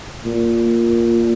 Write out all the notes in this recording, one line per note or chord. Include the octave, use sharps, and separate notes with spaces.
A#2